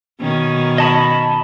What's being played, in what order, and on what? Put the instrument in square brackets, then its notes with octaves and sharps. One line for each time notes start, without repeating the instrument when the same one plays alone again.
[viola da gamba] B2 D#3 C#4
[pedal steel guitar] D#5 A5 B5